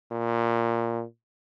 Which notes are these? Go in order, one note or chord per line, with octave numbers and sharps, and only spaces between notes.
A#2